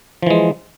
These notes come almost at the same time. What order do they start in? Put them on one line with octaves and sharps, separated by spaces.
F3 E3 G#3